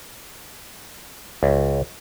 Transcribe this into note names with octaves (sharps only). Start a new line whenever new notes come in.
C#2